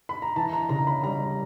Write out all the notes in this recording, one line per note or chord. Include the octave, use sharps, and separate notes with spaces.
B5
A#5
E3 A5
A#5
C#3 A#5
B5
G3 A#5